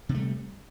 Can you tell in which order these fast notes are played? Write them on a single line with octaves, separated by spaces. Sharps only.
C3 C4 A3 G3